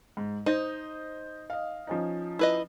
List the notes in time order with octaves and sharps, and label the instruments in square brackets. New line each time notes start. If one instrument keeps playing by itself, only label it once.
[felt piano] G#2
[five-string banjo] D#4 [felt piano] C5 D#5
[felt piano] D#5 F5
F3 C#4 D#4
[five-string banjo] E4 B4 D#5